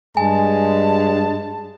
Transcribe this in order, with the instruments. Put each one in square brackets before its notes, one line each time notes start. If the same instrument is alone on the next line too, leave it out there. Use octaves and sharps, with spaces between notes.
[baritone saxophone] G2 [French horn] G#3 [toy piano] G#5 [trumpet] A5